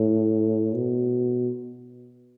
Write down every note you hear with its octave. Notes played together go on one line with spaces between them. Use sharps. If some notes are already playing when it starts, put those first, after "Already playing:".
Already playing: A2
B2